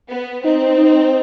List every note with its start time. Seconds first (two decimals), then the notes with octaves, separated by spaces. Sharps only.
0.10 B3
0.43 C4 D#4
0.61 D#4
0.78 D#4